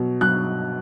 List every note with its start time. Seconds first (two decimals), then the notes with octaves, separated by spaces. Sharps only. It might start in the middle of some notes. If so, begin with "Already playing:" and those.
Already playing: B2 F#3
0.21 F#3 F#6